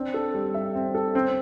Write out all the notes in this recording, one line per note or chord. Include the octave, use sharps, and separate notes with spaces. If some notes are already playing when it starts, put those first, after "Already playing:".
Already playing: C4 D4
A4
G3
E5
C4
A4
C4